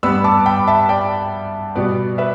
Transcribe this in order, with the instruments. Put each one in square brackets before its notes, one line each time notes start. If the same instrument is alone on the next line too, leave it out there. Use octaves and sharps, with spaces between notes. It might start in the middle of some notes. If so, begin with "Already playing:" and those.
[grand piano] G2 G3 B3 B5 E6
A5 D6
G5 B5
E5 A5
D5 G5
B2 G3 B3 D5
B4 E5